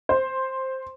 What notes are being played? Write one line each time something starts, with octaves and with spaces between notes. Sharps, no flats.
C5